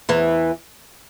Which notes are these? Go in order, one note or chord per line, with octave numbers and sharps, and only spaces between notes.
E2 E3